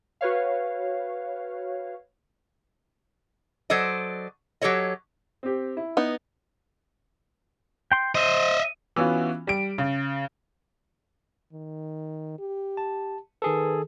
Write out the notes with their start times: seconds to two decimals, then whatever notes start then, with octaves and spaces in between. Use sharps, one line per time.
0.21 F#4 B4 C#5 F5
3.70 F#3 A4 C5 D5 D#5
4.62 F#3 G4 A4 C#5 D#5
5.43 C4 G4
5.77 E4
5.97 B3 D#4
7.92 G5 C6
8.15 C5 D#5 E5
8.96 E3 B3 C#4 F4 F#4
9.47 G3 D7
9.78 C#3
11.53 D#3
12.39 G4
12.77 A5
13.42 D#3 G#4 A4 B4